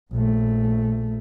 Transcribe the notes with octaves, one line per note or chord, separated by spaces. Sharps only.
A#1 A3